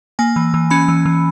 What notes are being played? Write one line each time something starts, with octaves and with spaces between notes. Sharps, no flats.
A#3 G#5
E3
E3
C#4 B5
E3
E3